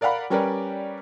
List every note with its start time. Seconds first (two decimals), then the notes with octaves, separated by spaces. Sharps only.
0.01 A#4 D5 F5 F#5 B5
0.30 G3 C#4 G4 A#4 B4 D5